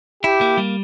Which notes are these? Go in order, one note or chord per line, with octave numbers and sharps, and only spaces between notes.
E4 G4
A#3
G3